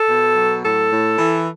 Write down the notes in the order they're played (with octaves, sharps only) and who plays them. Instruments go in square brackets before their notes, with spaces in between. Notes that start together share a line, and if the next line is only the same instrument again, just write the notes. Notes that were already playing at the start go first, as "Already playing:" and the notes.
Already playing: [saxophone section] A4
B2
F#3
A2 A4
A2
E3